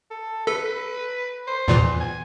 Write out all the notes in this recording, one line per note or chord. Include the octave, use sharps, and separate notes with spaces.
A4
A4 B4
C5
E2 A#2 E3
G#5